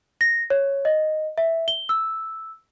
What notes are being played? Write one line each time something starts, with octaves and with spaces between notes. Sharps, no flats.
A#6
C#5
D#5
E5
G7
E6